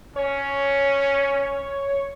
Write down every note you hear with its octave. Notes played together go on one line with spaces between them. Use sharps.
C#4 C#5